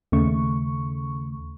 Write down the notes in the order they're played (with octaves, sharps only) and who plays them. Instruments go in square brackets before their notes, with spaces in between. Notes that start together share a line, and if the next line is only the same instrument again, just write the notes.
[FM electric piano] D#2 C#3 A3 C#6